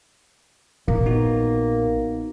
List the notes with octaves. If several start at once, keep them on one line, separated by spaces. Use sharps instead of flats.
A#1 A#3
B3 D#4 F#4